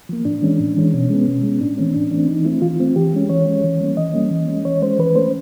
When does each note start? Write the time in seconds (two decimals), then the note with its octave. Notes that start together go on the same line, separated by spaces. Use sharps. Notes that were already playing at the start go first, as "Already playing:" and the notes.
0.09 F3 A#3
0.25 A2 D4
0.42 E3 G#3 C#4
0.60 A2
0.76 E3 G#3 C#4
0.93 B2 C#4
1.10 G#3 B3
1.27 B2
1.44 G#3 B3
1.61 A2 D4
1.77 E3 A3 C4 C#4
1.94 A2 D4
2.11 E3 A3 C4 D4
2.29 E3 D#4
2.45 A3 C4 E4
2.62 E3 F4
2.80 A3 C4
2.96 E3 G4
3.14 G#3 C#4
3.29 E3 C#5
3.47 G#3 C#4
3.64 E3
3.81 G3 A#3 C#4
3.97 E3 D#5
4.14 G3 A#3 C#4
4.31 E3
4.48 G#3 C#4
4.65 E3 C#5
4.82 G#3 C#4 C5
4.98 E3 B4
5.15 A3 C#4 C5